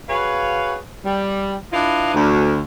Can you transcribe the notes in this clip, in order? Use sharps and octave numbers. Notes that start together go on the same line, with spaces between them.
F#4 G#4 B4 C#5 F5
G3
D4 E4 F4 B4 D#5 F5
D2